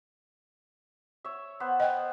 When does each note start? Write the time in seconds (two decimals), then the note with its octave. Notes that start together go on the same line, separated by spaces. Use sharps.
1.25 C#5 E5
1.60 B3 B4 C5
1.80 D#5 G5